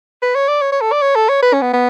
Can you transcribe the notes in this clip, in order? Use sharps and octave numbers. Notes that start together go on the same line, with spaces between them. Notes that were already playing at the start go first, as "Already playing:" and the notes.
B4
C#5
D5
C#5
C#5
A4
D5
C#5
A4
C#5
B4
C#4
B3
B3